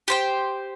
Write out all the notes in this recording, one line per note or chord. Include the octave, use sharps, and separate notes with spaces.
G4 C5 G5